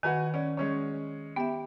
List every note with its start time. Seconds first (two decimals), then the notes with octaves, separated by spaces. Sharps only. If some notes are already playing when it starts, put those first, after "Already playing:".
0.03 D#3 F#4 B4 G#5
0.34 C#4 D5
0.57 G#3 C#4 C#5
1.36 B3 G4 E5